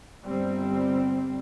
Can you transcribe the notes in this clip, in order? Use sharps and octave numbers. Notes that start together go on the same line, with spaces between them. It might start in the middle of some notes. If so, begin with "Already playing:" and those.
G1 G3 C4